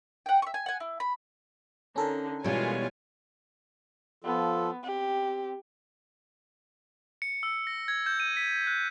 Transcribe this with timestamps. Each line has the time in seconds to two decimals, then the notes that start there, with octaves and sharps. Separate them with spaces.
0.26 F#5 G5
0.42 E5 C#6
0.54 G#5
0.66 F#5 G#5
0.80 E4
1.00 B5
1.96 D3 C#4 D#4 A4 A#4
2.44 B2 E3 G3 G#3 F4 C#5 G#5
4.24 F3 B3 F4 A4
4.83 C4 G4
7.22 C#7
7.43 E6
7.67 A#6
7.88 G#6
8.06 G6
8.20 D#7
8.37 B6
8.67 F#6